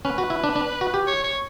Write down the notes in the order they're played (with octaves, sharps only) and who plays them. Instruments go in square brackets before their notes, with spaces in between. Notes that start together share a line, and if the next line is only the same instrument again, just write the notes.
[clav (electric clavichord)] C#4 [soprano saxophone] B4
[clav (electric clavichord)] F#4
E4
D4
D4
F#4
G4
[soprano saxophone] C#5
C#5